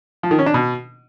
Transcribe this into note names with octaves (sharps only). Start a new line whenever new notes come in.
F3
D#3
C#4
D4
B2